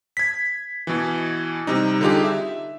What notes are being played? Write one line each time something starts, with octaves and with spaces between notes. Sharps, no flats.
G#6 B6
B2 E3
C3 G3 D#4
D3 G3 D#4 F4 G4 G#4
E5